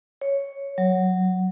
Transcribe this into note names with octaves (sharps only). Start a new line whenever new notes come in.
C#5
F#3